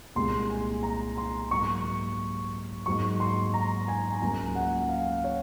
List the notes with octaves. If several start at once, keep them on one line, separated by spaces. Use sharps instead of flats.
C2 A#2 G#3 C6
G#5
A#5
C6
G#2 F#3 A#3 C#6
G#2 F#3 A#3 C#6
C6
A#5
G#5
A#5
C#2 C#3 F#3 A#3 G#5
F#5
F5
C#5